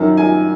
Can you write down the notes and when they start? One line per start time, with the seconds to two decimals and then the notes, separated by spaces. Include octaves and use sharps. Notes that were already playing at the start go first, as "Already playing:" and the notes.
Already playing: F#2 D#3
0.17 G#5